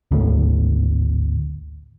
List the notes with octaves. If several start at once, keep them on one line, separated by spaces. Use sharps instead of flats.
G#1 D2 A2